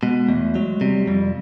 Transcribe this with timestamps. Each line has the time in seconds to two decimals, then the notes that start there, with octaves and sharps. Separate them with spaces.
0.03 B2 G#3
0.29 E2 A3
0.55 F#3 G#3
0.81 C3 G3
1.07 F2 G3